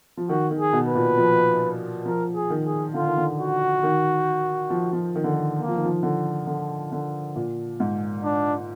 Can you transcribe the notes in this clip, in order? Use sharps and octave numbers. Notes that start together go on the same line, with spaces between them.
F3
D#3 F#4
D#3
G#4
B2
B4
A#2
F3
F3 A#4
G#4
D#3
G#4
D3 F4
D#3
D3
F#4
D#3
F3
F3
D#3
D3
D#3
A#3
F3
D#3
F3
D3
D3
D3
A#2
G#2
D4